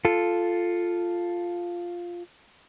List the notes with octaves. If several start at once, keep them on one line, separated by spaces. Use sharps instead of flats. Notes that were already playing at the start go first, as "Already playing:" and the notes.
F4 A4